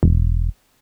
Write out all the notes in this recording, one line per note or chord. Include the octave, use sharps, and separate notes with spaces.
E1